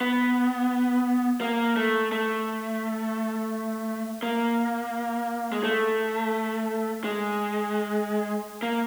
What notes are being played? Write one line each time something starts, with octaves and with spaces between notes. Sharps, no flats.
B3
A#3
A3
A3
A#3
G#3
A3
G#3
A#3